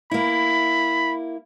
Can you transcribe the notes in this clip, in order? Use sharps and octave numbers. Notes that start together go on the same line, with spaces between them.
A#3 E4 B5